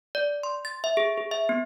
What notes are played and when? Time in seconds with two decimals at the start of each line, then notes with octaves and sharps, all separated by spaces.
0.15 D5
0.43 C6
0.65 A6
0.84 E5
0.97 G#4
1.18 G#4
1.31 E5
1.49 B3